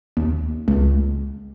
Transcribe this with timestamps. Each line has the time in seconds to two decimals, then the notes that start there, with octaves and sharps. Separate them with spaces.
0.17 D#2
0.68 C#2